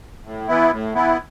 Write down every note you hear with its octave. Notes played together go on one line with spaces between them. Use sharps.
A2
E3 B3 E4
A2
E3 B3 E4